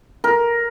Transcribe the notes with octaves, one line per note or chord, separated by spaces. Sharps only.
A#4